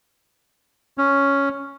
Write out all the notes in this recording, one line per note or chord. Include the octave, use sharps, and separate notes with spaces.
C#4